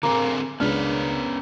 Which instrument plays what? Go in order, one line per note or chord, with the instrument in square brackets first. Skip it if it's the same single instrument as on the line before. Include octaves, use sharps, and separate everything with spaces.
[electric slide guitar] D3 C4 G#4 [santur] A#3
[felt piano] C#2 D4 F6 [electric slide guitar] B3 C#4 B4